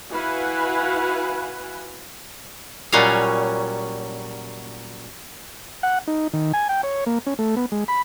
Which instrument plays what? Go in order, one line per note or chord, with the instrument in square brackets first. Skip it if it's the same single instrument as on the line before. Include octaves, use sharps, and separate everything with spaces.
[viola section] E4 F#4 B4 F5 F#5 G#5
[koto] A#2 F#3 G3 C#4 D#5 F5
[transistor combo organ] F#5
D#4
D#3
G#5
G5
C#5
A#3
C#4
A3
B3
G#3
B5